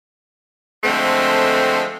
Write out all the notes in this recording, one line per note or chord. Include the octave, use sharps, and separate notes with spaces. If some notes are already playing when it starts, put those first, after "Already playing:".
D3 F3 G#3 A3 C4